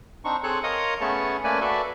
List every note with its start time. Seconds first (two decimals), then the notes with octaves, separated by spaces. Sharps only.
0.25 C4 D4 D#4 C#6
0.43 C4 G#4 A4 C#5 F#6
0.63 A#4 C#5 D#5 F5 C6 D#6
1.01 A3 B3 C#4 G#4 C#5 A5
1.44 A3 A#3 C#4 B4 D5 G#5
1.61 F#4 A4 B4 D5 E5